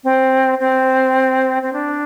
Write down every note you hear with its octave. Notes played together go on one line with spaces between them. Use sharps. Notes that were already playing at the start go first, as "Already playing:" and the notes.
C4
C4
C4
D4